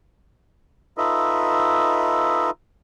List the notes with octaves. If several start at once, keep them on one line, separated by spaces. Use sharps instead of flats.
D#4 F4 A4 B4 D#5 E5